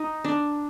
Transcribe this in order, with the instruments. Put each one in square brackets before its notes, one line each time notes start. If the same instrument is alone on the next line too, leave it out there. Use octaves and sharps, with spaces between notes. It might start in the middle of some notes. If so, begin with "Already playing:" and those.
Already playing: [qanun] D#4
D4